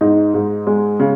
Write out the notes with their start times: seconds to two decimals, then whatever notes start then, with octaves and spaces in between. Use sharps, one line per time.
0.01 G#2 D#4
0.34 G#2
0.67 G#3
1.00 C#3